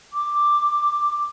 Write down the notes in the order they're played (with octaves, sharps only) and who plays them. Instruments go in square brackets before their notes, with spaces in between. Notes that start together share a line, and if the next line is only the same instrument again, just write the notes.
[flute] D6